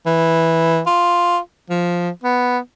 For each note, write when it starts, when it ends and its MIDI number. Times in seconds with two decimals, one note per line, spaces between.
0.06 0.81 52
0.87 1.38 65
1.70 2.10 53
2.24 2.59 59